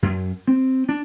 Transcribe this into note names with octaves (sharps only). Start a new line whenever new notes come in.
F#2
C4
D4